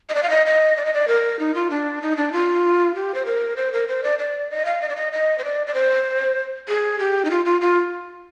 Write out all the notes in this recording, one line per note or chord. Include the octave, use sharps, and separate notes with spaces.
D#5
D5
F5
D#5
D#5
D5
D#5
D5
A#4
D#4
F4
D4
D#4
D4
F4
G4
C5
A#4
C5
A#4
C5
D5
D5
D#5
F5
D#5
D5
D#5
D#5
C5
D5
D5
C5
G#4
G4
D#4
F4
F4
F4